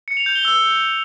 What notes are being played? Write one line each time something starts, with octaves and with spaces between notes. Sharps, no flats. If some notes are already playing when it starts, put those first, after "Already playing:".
C#7
F7
G6
G7
E6